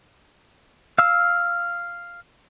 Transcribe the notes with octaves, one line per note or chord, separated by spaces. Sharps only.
F5 E6